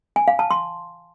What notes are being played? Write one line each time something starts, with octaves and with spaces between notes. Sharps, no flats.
G#5
F5
A5
C6